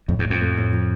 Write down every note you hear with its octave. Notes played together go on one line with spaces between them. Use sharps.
F2 A2
E2
A2
F2
A3
A2
F3